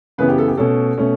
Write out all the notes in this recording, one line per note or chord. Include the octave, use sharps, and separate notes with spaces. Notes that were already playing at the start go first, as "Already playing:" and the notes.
F#2 C#3 E3 B3 B4
G4
A4
G4
B2 A3 C#4 A4
B2 A3 C#4